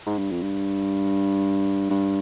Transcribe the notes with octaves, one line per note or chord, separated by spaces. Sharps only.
G#2
G2
F2
G2
G2